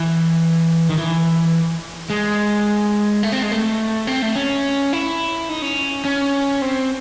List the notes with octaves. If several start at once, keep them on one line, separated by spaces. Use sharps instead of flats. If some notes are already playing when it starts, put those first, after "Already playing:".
Already playing: E3
D#3
E3
G#3
A3
C4
G#3
A3
C4
A3
C#4
E4
D#4
C#4
C#4
C4